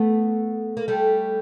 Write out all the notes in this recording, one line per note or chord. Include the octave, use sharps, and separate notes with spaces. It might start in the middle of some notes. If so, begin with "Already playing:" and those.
Already playing: A3 B3
A#3
G3 A3